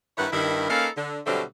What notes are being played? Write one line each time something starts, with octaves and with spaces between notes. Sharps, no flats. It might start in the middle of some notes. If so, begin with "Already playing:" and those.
G2 D#3 E4 B4 C#5 F#5
G2 D#3 E4
A#3 C#4 D#4 A4 B4 F5
D3
B2 D3 F#3 G3 A3 C4